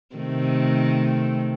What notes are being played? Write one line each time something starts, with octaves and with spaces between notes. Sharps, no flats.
C3 D#3 A3